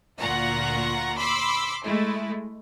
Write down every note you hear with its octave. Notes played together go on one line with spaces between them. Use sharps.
D2 A#2 F4 F#5 A#5 C#6
B5 C6 D6 E6
G#3 A3 E4